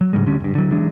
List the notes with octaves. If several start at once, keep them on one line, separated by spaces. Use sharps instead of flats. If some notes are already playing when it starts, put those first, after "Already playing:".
F#3
G#2 C#3 G3 G#3
D2 D3 G3 C#4
F#1 G2
D3 F#3
E3 F#3 G#3 D4